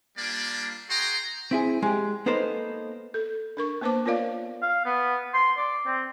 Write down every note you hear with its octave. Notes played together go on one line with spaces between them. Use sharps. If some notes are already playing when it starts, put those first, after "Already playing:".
G3 A#3 D4 F4 D5
F#4 G#4 G5 A#5 C6
C4 E4 G#4
G#3 G4
A#3 B3 D#4 A4 C5
A4
D4 A#4 C#6
A#3 B3 B4 C5 A5 D6
B3 F4 A#4 C#5 D5 F5
F5
B3
C6
D5
C4